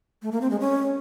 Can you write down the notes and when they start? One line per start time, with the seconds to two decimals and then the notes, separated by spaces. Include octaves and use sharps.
0.22 A3
0.32 A#3
0.41 C4
0.51 G#3
0.60 C#4